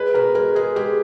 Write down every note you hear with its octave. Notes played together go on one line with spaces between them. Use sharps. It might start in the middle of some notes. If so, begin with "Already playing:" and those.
Already playing: G#3 B4
B2 A#4
G#3 A#4
G#3 G#4
G#3 G4